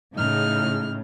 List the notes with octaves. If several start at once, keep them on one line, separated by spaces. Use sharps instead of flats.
A2 C#3 D#4 F6